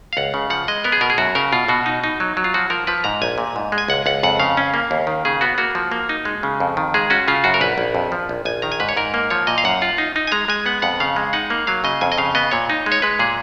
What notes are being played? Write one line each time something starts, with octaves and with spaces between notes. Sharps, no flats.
F5
C#2 F#5
C#3
F3 F#5
G#3 D#5
B3 A#4
G#4
B2 A#4
G#4
F#2 F#4
C#3 A#4
B2 F4
B2 F#4
D#4
D#4
F#3
F#3
F4
F3 F#4
F3 A#4
F3 B4
G#2 A#5
A#1 G#5
A#2
G#2
G#3
G#5
C#2 F#5
C#2 F#5
F2 F#5
C#3 F5
C#4
A#3
D#2
D#3
C#3 G#4
B3 F#4
A#3 F#4
F3
A#3
D#4
G#3
C#3
F2
D#3
G#3 G#4
C#4 F#4
C#3 F4
F#2 F#4
A#4
A#1 B4
A#1
F2
F3
A#1
A#1 G#5
D#3 A#5
G#5
G#2 B4
C#5
G#2 A#4
A#3
F3 C#5
A#2 D#5
F5
F#2 F#5
F4
D#4
D#4
G#5
G#3 A#5
G#3 G#5
B3 F#5
F2 F#5
C#3 F5
G#3
D#4 F#5
A#3
F#3 F5
C#3 D#5
F2 G#5
D#5
C#3 F5
B3 D#5
A#2 C#5
D#4
G#3
C#5
G#3 B4
A#2 G#4